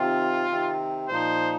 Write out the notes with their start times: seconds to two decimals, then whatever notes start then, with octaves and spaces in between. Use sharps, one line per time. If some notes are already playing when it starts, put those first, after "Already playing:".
Already playing: C3 D#3 C4 F4
0.49 C3 D#3 C4
1.08 A#2 F3 D#4 C5